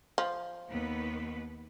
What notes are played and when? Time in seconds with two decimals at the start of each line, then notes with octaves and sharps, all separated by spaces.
0.18 F3
0.70 D#2 B3 B4